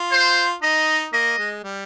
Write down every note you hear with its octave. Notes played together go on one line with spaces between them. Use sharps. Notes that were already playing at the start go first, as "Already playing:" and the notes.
Already playing: F4
C5
D#4 D#5
A#3 D#5
G#3
G3